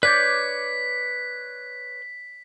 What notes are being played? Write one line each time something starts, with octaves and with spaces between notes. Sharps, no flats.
B4 C#5 D5 G6 B6